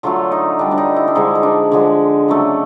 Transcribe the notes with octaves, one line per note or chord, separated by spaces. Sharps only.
D3 F#3 A3 F4
D#4
D3 G3 D4
D4
D#4
E4
D4
D3 F3 G#3 D#4
D#4
D4
D3 F3 G#3
C#3 F#3 A3